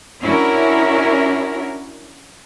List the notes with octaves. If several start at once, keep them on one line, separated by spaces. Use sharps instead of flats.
C#4 D4 E4 F#4 A#4